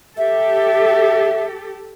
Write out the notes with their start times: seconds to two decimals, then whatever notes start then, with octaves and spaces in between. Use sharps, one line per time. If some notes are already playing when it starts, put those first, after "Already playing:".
0.18 G4 A4 E5